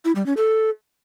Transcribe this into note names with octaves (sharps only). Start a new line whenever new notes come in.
E4
G3
C#4
A4